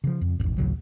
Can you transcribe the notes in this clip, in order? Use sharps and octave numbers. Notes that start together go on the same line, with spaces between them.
C#3 F3
F2
E1 A1 E2
A1 D2 C#3 F#3